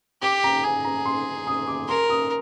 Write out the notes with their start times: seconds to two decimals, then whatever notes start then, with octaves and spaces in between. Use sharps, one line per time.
0.22 G4 D6
0.44 A#5
0.64 G#4 G#5
0.85 A#5
1.06 C6
1.47 D#6
1.68 D6
1.88 A#4 C6
2.10 D#6